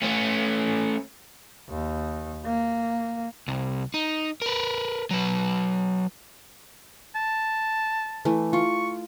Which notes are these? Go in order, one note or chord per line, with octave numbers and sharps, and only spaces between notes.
A3 C#4
D#2
A#3
C2
D#4
A#4 B4
F#3 B4
A5
E3 A3
F4 C#6